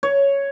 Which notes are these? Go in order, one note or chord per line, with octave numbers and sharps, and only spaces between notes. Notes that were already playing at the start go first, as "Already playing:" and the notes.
C#5